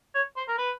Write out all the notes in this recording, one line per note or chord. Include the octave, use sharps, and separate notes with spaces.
C#5
C5
A#4
B4